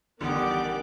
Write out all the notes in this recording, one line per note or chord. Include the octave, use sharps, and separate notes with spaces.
A1 D3 D#3 G3 B3 G4 D5 D6